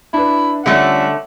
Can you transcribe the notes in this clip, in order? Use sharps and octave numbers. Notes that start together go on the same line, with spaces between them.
D4 E4 B4
D3 G3 A3 C#4 F4 E5 F#5